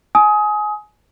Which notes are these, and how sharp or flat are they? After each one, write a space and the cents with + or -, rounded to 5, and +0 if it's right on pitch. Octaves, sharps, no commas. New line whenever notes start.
G#5 +20 D#6 +20